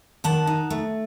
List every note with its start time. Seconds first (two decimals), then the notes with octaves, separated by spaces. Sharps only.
0.24 D#3 F#5 A5
0.47 D#4
0.70 A3